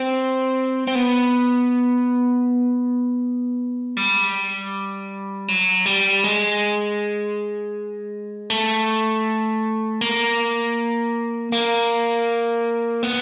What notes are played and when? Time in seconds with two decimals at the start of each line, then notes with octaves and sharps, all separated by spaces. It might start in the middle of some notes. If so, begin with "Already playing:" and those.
Already playing: C4
0.87 C4
0.95 B3
3.97 G3
5.48 F#3
5.86 G3
6.24 G#3
8.50 A3
10.01 A#3
11.52 A#3
13.03 B3